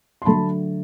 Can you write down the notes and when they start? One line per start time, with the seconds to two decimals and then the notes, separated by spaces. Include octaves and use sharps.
0.22 C6
0.25 D3 F#3 A3 A5 B5